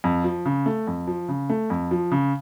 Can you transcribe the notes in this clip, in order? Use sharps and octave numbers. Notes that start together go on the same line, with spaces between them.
F2
F3
C#3
A3
F2
F3
C#3
A3
F2
F3
C#3